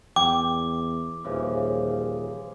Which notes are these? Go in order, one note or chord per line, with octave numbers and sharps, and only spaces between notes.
E2 G5 D6
D#1 C#3 E3 F3